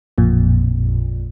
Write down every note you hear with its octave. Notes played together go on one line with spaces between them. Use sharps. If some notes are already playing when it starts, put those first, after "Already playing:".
A1 F2 A#2